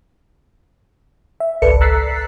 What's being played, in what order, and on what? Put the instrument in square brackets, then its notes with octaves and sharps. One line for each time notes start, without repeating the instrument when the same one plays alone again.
[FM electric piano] E5
G#1 C#2 A4 B4 D5 C#7
A#5 E6 F#6 A6 B6 C7